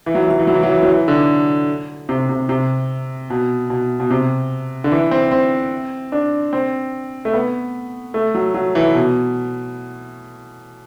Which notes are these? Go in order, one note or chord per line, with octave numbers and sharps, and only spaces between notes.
E3
F#3
E3
F#3
E3
F#3
E3
F#3
E3
F#3
E3
D3
C3
C3
C3
B2
B2
B2
C3
D3
E3
C4
C4
D4
C4
A3
B3
A3
F#3
F#3
E3
B2